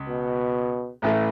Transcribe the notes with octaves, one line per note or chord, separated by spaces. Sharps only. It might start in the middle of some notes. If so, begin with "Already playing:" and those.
Already playing: C#2
B2
A1 A2 E3 A3